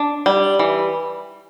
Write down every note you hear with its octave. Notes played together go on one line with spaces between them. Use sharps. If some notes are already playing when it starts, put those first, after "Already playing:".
Already playing: D4
G3
E3